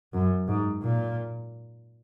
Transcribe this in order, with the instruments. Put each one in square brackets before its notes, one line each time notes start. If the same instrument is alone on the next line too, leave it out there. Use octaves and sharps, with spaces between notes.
[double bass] F#2
G#2
A#2